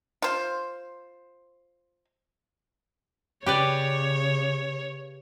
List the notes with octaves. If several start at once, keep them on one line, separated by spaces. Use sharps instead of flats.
F4 C5
C#3 G4 B4 C#5 D5